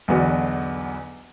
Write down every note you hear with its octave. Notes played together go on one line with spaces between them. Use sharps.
B1 E2 D3 B3 F#4